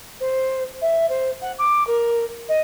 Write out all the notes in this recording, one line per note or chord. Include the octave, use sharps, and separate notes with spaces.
C5
E5
C5
F#5
D6
A#4
D#5